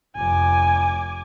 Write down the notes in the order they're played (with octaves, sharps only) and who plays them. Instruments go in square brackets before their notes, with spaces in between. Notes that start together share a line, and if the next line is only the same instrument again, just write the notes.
[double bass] F1 [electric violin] G#5 D6